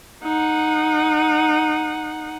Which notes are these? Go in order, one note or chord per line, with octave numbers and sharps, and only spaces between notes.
D#4 F#5